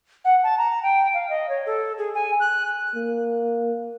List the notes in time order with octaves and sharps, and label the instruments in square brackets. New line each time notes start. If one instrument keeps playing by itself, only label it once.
[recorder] F#5
A5
A#5
G5
F5
D#5
C#5
A4
G#4
G#5
F#6
[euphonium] A#3